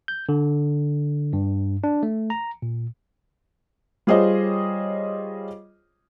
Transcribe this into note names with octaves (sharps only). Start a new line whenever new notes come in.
G6
D3
G2
D4
A3
A#5
A#2
G3 F4 G#4 C5 C#5 D#5